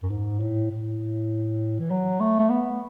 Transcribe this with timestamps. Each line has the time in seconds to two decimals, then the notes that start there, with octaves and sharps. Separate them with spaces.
0.03 F#2
0.09 G#2
0.40 A2
0.70 A2
1.79 E3
1.90 F#3
2.20 A3
2.39 A3
2.49 B3